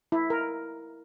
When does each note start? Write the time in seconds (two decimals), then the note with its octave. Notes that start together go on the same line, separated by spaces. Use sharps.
0.12 E4
0.30 A#4